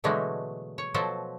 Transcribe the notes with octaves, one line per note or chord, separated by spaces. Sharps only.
B2 D3 E3 F#3 G#3 A3
C#5
B2 F3 F#3 A4 C5